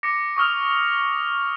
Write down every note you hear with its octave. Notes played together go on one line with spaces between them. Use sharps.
D6 A#6 C#7
C#6 D#6 F6 F7